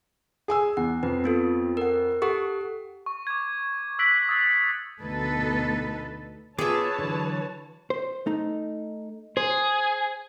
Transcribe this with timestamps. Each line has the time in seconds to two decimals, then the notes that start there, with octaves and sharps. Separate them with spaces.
0.48 G#4 G#5 E6
0.77 E2 F#5
1.03 F2 B4
1.24 B3 F4 A4
1.77 A#4 F#5
2.22 G4 A4 F#5 C#6
3.06 C#6
3.27 D6 G#6
3.99 E6 F#6 A#6 B6 D7 F#7
4.28 D#6 E6 G#6 A6 C7
4.46 G6 C#7
5.02 D2 B2 D#4 A4 B4
6.58 B3 F4 G#4 B4 C#5 E5 A5 D6
6.99 D3 E3 F#3
7.90 C5
8.26 A3 D#4
9.37 G#4 C5